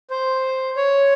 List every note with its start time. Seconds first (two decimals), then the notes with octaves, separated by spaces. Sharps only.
0.10 C5
0.77 C#5